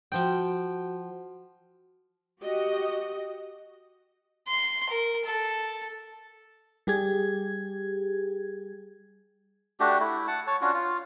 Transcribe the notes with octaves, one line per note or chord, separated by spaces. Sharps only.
F3 F#4 F#5 G5
F#4 G4 D#5
C6
A#4
A4
G3 G4 G#4 G#6
A3 D4 F#4 G4
A3 E4
F#5 A5
C#5 A5
C#4 D4 F4 F#4
F4